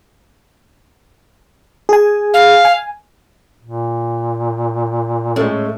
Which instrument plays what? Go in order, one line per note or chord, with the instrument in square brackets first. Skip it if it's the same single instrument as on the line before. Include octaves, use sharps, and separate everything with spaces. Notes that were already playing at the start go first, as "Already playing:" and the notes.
[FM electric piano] G#4 G#5
[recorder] F5
[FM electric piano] G#5
[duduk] A#2
[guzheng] A2 [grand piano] G#3 A3 C#4